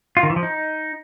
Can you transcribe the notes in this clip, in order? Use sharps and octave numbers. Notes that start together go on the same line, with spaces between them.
F4
D#3
E3
F3
D#4